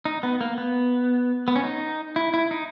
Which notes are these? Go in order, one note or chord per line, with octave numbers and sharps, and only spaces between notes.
D#4
B3
A#3
B3
B3
C#4
D#4
E4
E4
D#4